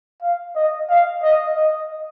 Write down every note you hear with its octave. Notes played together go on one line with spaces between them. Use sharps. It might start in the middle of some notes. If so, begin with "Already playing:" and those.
F5
D#5
F5
D#5
D#5